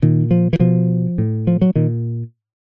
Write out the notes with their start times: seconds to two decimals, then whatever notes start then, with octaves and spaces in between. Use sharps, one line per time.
0.02 A#2 D#3
0.31 F3
0.53 E3
0.60 B2 F3
1.18 A2
1.47 F3
1.62 F#3
1.76 A#2 D#3